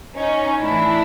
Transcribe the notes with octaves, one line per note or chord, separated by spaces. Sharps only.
C#4 D#4
A2 E3 D4 E4